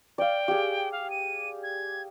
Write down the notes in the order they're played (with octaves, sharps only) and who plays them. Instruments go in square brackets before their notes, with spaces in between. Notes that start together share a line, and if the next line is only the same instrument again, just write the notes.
[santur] D5 F5 [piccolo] G5
[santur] G4 G#4
[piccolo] F5
D#7
G#6